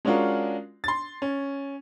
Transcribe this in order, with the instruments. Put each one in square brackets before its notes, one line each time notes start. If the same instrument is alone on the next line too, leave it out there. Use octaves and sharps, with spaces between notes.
[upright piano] G#3 C#4 D4 F4 F#4 A#4
C6 A6
C#4